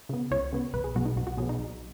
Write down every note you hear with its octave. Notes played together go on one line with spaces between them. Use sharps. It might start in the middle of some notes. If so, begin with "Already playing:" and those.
C#3 B3
C#2 C#5
C#3 B3
B1 B4
G#4
B2 F#3 B3 F#4
D#4
B1 F#4
F#4
B2 F#3 B3 G#4
D#4
B1